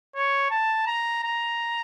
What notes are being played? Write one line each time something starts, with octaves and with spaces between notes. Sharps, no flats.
C#5
A5
A#5
A#5